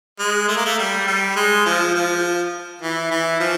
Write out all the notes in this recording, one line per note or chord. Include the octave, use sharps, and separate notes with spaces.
G#3
A3
A#3
A3
G3
G3
G#3
F3
F3
E3
E3
F3